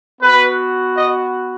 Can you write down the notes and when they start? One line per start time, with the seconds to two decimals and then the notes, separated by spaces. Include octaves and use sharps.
0.22 B3 F#4 B4
0.97 D#5